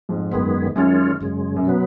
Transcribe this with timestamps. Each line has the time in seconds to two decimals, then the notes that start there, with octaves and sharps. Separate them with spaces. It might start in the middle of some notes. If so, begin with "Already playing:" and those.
0.09 F2 G#2
0.32 F#2 D#3 G#3 B3
0.76 F#2 D#3 G#3 C#4 F4
1.21 F#2 C#3 G#3
1.56 F#2
1.65 B2 F#3 B3